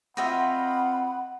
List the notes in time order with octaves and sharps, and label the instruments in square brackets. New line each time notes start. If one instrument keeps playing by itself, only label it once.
[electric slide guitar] C4 F4 [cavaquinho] F#4 D#5 E5 [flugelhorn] F#5 [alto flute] B5